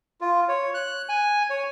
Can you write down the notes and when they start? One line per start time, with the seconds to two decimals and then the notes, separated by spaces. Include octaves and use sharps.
0.21 F4
0.49 C#5
0.74 F#6
1.09 G#5
1.50 C#5